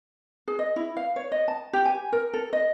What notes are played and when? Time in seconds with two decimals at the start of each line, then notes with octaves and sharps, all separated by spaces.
0.48 G#4
0.59 D#5
0.76 E4
0.97 F5
1.16 C#5
1.32 D#5
1.48 A5
1.73 G4
1.85 G#5
2.12 A#4
2.34 A4
2.53 D#5